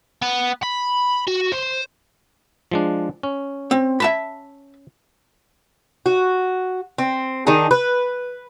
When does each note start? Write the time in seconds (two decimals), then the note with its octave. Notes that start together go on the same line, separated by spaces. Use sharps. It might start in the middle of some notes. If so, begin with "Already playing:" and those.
0.22 B3
0.63 B5
1.28 F#4
1.52 C5
2.71 F3 G#3 D4
3.23 C#4
3.71 C4
4.00 E5 A5 B5
6.06 F#4
6.98 C4
7.47 D#3 D4 D#4 G#4
7.71 B4